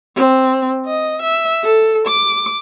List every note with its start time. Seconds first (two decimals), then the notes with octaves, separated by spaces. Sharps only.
0.16 C4
0.86 D#5
1.22 E5
1.64 A4
2.08 D6